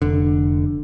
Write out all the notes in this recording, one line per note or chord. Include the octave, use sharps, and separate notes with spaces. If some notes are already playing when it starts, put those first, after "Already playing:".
F1 D3